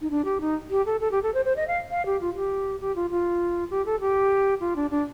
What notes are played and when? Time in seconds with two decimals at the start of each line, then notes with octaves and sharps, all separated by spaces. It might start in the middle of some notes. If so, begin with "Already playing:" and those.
0.01 D#4
0.10 D4
0.25 G4
0.41 D#4
0.70 G4
0.86 A4
1.01 A4
1.11 G4
1.23 A4
1.34 C5
1.45 C5
1.56 D#5
1.68 F5
1.91 F5
2.06 G4
2.21 F4
2.35 G4
2.81 G4
2.96 F4
3.10 F4
3.70 G4
3.86 A4
4.00 G4
4.60 F4
4.76 D4
4.91 D4